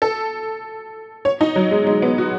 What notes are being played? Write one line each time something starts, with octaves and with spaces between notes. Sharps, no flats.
A4
C#5
D#4
F#3
G#3
G#3
B3
F#4